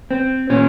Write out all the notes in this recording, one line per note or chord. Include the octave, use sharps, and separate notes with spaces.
C4
A#2 C#4